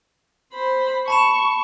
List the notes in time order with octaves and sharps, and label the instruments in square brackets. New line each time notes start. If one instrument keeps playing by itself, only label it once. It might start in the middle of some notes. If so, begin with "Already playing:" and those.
[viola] C5 B5
[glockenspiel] A5 B5 E7 [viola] C#6